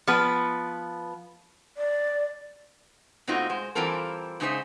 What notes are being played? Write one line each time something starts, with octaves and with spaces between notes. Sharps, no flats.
F3 B3 B4
D5
B2 A3 C4 D#4 F4 F#4
G#3 C5
E3 G3 C4 F4 A4 A#4
G#2 C#3 D#4 G#4 C5 E5